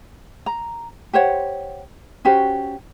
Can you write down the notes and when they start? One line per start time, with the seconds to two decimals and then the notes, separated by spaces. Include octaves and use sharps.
0.46 A#5
1.13 G4 C5 C#5 F#5
2.25 C#4 F#4 G4 C5